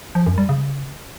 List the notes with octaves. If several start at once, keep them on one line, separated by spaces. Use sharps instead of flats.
F3
F#2
G3
C#3